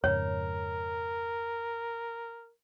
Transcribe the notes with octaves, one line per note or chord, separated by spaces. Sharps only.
F2 G#2 C#3 A#4 C#5